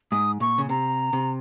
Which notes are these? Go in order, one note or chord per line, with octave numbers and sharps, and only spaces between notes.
G#2 D#6
A#2 C#6
C#3
C3 A#5
C3